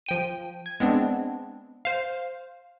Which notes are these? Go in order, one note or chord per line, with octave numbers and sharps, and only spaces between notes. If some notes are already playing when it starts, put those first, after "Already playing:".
F3 G5 D#7
G#6
G#3 B3 C4 D4
C5 F5